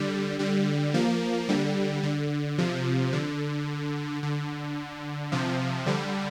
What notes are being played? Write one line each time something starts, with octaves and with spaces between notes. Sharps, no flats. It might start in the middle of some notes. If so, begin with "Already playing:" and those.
Already playing: D3 G3
D3 G3
F3 A#3
D3 G3
D3
C3 F3
D3
D3
C3 F3
D3 G3